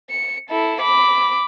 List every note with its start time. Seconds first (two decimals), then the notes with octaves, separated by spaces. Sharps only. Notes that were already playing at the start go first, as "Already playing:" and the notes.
0.10 C#7
0.50 E4 A4
0.81 B5 D6